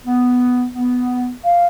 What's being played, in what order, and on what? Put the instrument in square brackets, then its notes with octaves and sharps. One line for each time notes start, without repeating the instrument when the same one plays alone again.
[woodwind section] B3
B3
[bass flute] F5